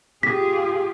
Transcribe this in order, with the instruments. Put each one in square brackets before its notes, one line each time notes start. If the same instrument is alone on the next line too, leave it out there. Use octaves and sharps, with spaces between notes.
[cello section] F4 G4 G#4 [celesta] B6